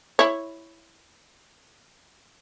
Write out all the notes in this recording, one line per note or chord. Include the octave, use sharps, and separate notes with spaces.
E4 C#5